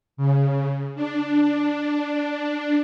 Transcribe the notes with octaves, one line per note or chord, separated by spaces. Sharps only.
C#3
D4